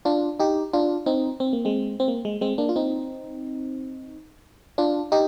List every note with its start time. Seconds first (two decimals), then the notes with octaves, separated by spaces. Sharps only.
0.05 D4 F4
0.40 D#4 G4
0.73 D4 F4
1.06 C4 D#4
1.40 C4
1.53 A#3
1.65 G#3 C4
2.00 C4
2.08 A#3
2.25 G#3
2.41 G#3 C4
2.58 A#3 D4
2.69 F4
2.76 C4 D#4
4.78 D4 F4
5.12 D#4 G4